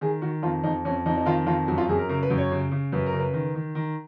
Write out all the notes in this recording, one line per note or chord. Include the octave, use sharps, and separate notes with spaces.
D#3 G#4
D#3 F#4
F2 F4
F2 D#4
F2 C#4
F2 D#4
D#4
D#3 F4
F2 F4
F#2 F#4
F4
F#2 G#4
A#4
C#3 A#4
B4
F#2
C#5
C#3
C#3
F#2 B4
A#4
C#3
B4
D#3
D#3
D#3